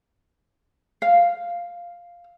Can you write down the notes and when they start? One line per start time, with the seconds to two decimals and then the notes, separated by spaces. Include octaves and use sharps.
1.02 F5